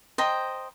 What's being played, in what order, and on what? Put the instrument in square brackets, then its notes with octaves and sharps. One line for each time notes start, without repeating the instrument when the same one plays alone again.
[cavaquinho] C5 D#5 G5 A#5